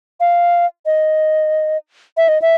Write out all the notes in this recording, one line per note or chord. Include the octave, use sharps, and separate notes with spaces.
F5
D#5
E5
D#5
E5